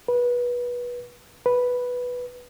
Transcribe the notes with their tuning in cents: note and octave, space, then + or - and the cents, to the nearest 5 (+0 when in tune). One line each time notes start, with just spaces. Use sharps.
B4 -20
B4 +0